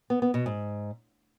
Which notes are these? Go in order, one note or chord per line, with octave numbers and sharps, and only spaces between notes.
B3
B3
B2
G#2